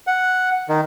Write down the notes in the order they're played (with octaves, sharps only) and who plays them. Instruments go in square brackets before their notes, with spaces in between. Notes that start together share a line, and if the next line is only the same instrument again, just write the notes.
[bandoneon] F#5
D#3